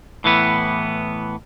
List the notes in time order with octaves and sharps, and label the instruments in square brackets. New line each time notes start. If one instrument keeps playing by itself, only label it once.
[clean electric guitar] A2 E3 B3